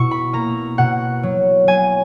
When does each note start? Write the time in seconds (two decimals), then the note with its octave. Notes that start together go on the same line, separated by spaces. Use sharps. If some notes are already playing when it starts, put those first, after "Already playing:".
Already playing: B2 E4 C#6
0.11 B5
0.33 A#3 A#5
0.78 B2 F#5
1.23 F#3
1.67 F#3 G#5